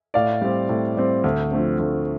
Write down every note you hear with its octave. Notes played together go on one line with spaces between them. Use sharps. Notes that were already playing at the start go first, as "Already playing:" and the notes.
A2 D5 F5
G3 C4
A2
G3 C4
D2
D3 F3 A3 C4
D2